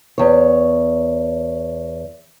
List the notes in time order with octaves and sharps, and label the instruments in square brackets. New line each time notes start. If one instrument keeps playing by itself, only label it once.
[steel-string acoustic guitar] E2 C#5